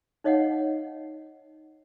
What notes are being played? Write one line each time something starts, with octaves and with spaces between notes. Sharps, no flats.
D#4 C#5 D#5 F5 F#5